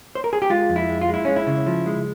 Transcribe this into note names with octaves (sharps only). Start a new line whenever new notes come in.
C5
A#4
G#4
G4
G#3 F4
F2
E4
G#3
F4
G#3
E4
G#3 C#4
E4
C#3
F3
G#3